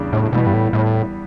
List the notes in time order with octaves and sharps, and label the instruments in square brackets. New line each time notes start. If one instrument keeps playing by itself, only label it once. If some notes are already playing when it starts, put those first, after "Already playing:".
Already playing: [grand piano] E2 C#3 G3 D4
[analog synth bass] A2
[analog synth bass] B2 [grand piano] E3 G3 B3
[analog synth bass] G2
A2
A2